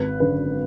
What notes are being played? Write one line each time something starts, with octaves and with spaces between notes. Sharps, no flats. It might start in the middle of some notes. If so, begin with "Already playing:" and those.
Already playing: G#1 B4
F#2 D3 B4